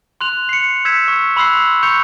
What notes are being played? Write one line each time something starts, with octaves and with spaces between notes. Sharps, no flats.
C6 F#6 F7
C7 C#7
E6 G6 G#6 B6 C#7 E7
C#6
B5 C6 E6 F#6 C7
C#6 F#6 G6 C#7 F7